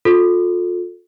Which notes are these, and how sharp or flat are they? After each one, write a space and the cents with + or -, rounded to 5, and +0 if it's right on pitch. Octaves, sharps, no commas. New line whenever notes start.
F4 +35 A4 +0